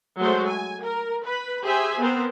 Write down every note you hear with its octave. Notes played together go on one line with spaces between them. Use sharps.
F#3 G#3 A3 C5
G#5
A#4
B4 B5
G4 G#4 C5 E5 G#5
B3 C4 A#4 C5